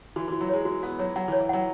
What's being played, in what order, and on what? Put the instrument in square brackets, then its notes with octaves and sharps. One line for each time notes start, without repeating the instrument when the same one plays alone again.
[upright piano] E3 [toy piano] F#4
[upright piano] E3 [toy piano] F#4
[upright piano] F#3
[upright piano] G#3 [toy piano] C#5
[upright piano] G#3 [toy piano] F#4
[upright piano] B3 [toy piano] F#4
[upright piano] F#3 [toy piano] C#5
[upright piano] F#3 [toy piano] F#5
[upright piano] E3
[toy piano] C#5
[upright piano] E3
[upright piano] F#3 [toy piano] F#5